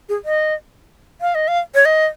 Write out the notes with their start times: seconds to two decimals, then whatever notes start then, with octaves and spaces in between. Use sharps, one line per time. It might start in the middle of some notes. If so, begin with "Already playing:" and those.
0.09 G#4
0.25 D#5
1.21 F5
1.35 D#5
1.48 F5
1.74 C#5
1.85 D#5